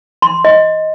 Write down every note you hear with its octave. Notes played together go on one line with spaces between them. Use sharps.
C6
D#5